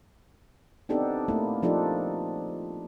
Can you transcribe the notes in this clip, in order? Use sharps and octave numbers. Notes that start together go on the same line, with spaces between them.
B3 C4 D4 D#4 G4 A4
A3 A#3 E4
F3 D4 D#4 F4 G4 A4